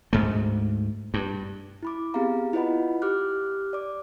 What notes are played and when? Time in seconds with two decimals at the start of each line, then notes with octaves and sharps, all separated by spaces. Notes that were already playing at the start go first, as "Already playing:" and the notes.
0.13 D2 G#2 A3
1.14 G2
1.83 E4 B5 D6
2.14 B3 C4 G4 G#4 F5 A#5
2.53 E4 F4 B4 D#5 F#5 B5
3.02 G4 D6 F6 F#6
3.73 D5 D6